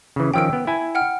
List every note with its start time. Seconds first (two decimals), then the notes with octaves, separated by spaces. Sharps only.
0.16 C#3 E3
0.34 D#3 F3 C#4 G5 E6 D7
0.53 B3
0.67 E4 G#5
0.95 F#5 G5 F6